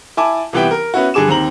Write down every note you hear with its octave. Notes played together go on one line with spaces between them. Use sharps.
E4 G#5 A5 D6
C2 C3 E3 B3 E4 G5
A#4
B3 C#4 E4 F#4
G2 D3 G#4 D6 E7
D#2 C4 A#5 F#7